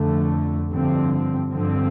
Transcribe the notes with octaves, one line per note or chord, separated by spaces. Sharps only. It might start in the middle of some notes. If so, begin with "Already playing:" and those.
Already playing: F2 D3 A3
G2 D3 F3 C4
G2 D3 F3 C4